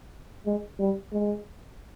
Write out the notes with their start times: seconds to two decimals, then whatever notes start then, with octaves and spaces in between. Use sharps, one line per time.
0.46 G#3
0.79 G3
1.12 G#3